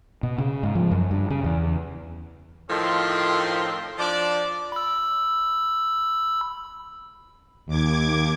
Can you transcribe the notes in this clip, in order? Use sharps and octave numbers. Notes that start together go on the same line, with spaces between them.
B2
C#3
G#2
F3
F#2
G2
C#3
E2
A2 D#3 F3 C4 C6
F3 D4 D5
B5 E6
D#2 D6 G#6